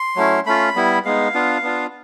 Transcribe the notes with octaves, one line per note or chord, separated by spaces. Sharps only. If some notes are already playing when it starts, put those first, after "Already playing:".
Already playing: C6
F#3 A3 C#4 E4
A3 C#4 F4 B5
G3 B3 E4
G#3 B3 D#4 F5
B3 D4 F4
B3 D4 F4